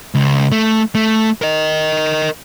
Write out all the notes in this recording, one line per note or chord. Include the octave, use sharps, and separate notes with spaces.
C#2
A3
A3
A#4 D#5